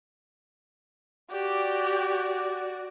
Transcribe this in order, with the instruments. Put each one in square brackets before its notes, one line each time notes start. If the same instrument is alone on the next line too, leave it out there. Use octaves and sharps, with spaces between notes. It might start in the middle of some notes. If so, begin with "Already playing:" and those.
[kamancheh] F#4 D5 [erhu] G4